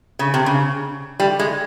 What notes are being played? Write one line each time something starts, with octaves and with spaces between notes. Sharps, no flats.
C#3
C3
C#3
G3
G#3